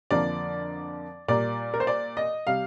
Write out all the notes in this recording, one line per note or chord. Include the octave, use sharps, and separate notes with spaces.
F2 D3 F3 A#3 D5
A#2 G3 A#3 D5
A#4
C5
D5
D#5
C3 G3 F5